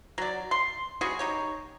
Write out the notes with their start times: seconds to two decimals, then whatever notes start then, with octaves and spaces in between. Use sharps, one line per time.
0.18 F#3 D5
0.51 C6
1.01 G3 C#4 F#4 G#4
1.19 D#4 G4 C#5